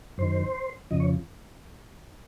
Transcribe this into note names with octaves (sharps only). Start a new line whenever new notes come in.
F#2 D#3 C5
F2 C#3 F3 D#5
C#5